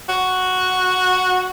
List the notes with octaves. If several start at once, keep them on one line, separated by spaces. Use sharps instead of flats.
F#4